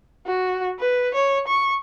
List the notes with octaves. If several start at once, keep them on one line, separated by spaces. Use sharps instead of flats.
F#4
B4
C#5
C#6